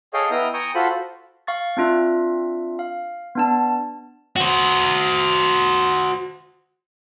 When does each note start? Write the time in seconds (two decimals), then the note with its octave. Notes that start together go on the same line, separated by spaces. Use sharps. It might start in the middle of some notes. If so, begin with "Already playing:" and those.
0.14 G#4 A4 C#5 D#5 F5 G5
0.31 B3 E4 D#5 G5 A#5 F6
0.54 G5 G#5 A#5 C#6 D#6
0.75 F4 F#4 A4 C5 B5
1.47 F5 C#6 A6
1.77 C4 D4 F4 E5
2.79 F5
3.35 B3 D4 A5
4.36 F#4 C5